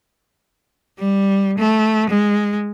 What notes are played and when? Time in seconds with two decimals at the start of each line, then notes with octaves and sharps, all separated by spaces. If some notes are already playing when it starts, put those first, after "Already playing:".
0.99 G3
1.58 A3
2.09 G#3